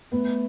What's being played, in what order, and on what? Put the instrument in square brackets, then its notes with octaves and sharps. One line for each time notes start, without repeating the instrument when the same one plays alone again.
[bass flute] A3 [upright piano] B3